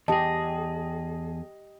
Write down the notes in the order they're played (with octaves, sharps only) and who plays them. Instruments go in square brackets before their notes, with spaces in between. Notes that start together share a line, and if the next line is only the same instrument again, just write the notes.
[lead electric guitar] E2 G#4 [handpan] G4 D#5 [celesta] A5